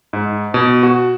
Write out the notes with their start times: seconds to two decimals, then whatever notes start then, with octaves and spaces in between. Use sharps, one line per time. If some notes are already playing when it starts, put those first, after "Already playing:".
0.13 G#2
0.54 B2
0.83 F#4